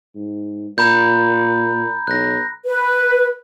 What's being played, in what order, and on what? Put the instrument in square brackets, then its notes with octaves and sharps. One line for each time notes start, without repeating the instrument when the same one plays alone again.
[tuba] G#2
[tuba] A#2 [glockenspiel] A#5 B5 G6
[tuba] B1 [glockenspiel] F#6 A#6
[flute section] B4